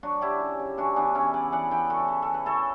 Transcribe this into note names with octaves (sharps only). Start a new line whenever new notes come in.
F#3 D4 F#4
F#3 E4 G4
C#3
C#3
E3 D4 F#4
E3 B3 D4
C#3 C#4 E4
C#3 B4 D5
E3 D5 F#5
E3 E5 G5
C#3 F#4 A4
C#3
E3 A4
B4
E3 A4 C#5